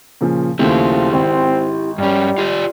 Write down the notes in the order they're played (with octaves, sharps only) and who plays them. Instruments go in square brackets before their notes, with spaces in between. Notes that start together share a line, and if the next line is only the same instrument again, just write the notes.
[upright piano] A#2 C#3 F3
[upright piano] D#2 C#3 A3 [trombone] F3 [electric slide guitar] E4 G4
[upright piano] G#1 [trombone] C4
[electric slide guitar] G2 C#4 [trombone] G3
[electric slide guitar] F4 G4 D5